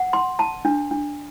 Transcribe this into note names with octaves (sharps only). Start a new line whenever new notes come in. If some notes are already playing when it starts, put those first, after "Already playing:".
Already playing: F#5
C6
A5
D4
D4